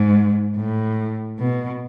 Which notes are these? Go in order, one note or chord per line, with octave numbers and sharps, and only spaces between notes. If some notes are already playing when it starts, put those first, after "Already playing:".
Already playing: G#2
A2
B2